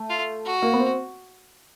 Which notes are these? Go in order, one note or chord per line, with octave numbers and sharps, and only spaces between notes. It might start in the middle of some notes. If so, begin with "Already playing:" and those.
Already playing: A3
F4
F#4
A#3
B3
C4